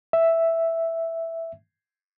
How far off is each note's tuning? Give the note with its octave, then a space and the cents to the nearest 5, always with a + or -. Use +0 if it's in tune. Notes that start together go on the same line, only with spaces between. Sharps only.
E5 +0